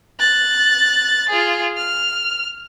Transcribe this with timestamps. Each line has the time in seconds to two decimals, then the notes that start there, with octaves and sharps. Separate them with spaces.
0.19 F#6 A6
1.29 F4 G#4
1.77 F6